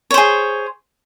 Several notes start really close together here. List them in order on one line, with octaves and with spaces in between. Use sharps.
C#5 C5 G#4